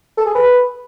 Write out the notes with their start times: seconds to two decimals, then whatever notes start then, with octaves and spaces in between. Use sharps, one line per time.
0.17 A4
0.26 G#4
0.35 B4